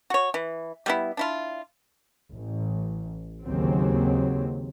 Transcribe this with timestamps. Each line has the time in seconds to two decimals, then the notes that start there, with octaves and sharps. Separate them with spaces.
0.10 F#4 C#5
0.34 E3
0.86 G3 B3 E4
1.17 D4 E4 F4
2.34 A1
3.45 D#2 C#3 F#3 C4